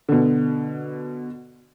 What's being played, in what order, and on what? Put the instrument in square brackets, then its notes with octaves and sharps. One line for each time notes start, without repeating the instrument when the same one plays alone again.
[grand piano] B2 D3